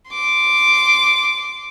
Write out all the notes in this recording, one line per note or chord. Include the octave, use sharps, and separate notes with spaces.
C6 D6